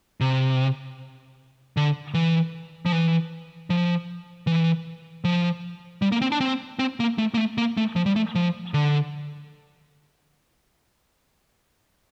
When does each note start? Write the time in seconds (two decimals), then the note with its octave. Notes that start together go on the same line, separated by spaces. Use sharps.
0.21 C3
1.77 D3
2.14 E3
2.86 F3
2.92 E3
3.70 F3
4.47 E3
5.24 F3
6.02 G3
6.12 A#3
6.22 C4
6.32 D4
6.41 C4
6.79 C4
7.00 A#3
7.18 A3
7.34 A#3
7.37 A3
7.58 A#3
7.77 A3
7.96 F3
8.06 G3
8.16 A3
8.35 F3
8.74 D3